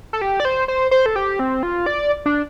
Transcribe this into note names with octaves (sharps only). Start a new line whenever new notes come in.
A4
G4
D5
C5
C5
C5
A4
G4
C4
F4
D5
D4